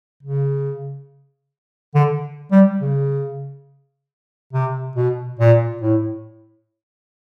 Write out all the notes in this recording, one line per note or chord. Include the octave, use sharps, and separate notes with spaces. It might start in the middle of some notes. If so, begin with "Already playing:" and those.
C#3
D3
G3
C#3
C3
B2
A#2
A2